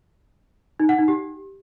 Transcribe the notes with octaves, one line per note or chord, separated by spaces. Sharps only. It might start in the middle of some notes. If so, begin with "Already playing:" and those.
D#4
F#5
D#4
G4